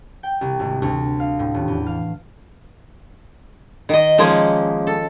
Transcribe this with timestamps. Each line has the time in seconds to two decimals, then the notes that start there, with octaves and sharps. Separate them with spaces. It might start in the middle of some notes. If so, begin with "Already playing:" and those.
0.23 G5
0.41 C2
0.60 G#1
0.82 D2
1.20 F5
1.39 A2
1.54 D#1
1.68 E2
1.87 F5
3.89 D#3 D#5
4.18 D#3 F3 G#3 A#3 C#4
4.87 A4